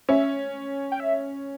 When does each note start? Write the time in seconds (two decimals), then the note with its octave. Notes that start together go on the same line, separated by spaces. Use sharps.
0.09 C#4 E5
0.92 G5
1.00 E5